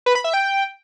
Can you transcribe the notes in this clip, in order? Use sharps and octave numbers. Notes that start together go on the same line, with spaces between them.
B4
B5
E5
G5